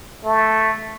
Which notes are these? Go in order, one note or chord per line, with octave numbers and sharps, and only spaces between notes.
A3